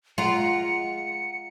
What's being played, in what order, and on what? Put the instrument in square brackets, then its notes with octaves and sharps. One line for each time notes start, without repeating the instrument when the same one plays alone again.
[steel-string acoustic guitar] G#3 F#5 A#5 [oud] F4 [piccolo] C#7